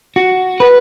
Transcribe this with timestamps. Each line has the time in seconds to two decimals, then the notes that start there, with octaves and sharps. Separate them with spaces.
0.16 F#4
0.60 B4